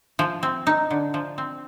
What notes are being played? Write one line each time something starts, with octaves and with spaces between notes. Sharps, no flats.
F3
C4
D#4
D3
F3
C4